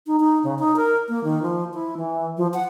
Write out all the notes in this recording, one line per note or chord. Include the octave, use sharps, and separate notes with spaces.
D#4
D#4
C#3
D#4
A#4
A#3
D#3
F3
E4
E3
F3
F#5